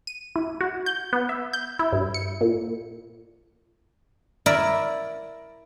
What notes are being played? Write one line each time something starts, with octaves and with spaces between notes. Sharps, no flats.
D#7
E4
F#4
G6
B3
E5
G6
E4
G2
C#7
A#2
E4 A#4 D5 E5